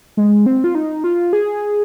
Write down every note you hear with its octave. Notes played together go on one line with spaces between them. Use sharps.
G#3
C4
F4
D#4
F4
G#4